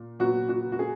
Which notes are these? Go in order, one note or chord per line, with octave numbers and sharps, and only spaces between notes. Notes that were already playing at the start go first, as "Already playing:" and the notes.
Already playing: A#2
A#2 F#3 B3 F#4
F#4
F#4
G#4